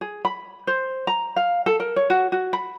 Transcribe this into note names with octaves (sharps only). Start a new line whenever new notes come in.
G#4
B5
C5
A#5
F5
A4
A#4
C#5
F#4
F#4
B5